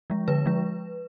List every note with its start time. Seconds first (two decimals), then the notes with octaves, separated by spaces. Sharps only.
0.10 F3 G#3
0.28 D3 B4
0.46 F3 G#3